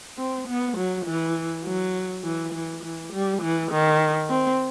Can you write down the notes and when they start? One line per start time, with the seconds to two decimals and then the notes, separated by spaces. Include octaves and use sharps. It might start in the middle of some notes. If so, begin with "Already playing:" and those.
0.18 C4
0.48 B3
0.77 F#3
1.06 E3
1.65 F#3
2.24 E3
2.53 E3
2.83 E3
3.13 G3
3.42 E3
3.72 D#3
4.30 C4